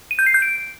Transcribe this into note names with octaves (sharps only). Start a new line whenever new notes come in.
D#7
G6
C7
G6
D7